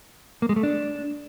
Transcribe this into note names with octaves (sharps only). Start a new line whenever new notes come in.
A#3
G#3
A3
D4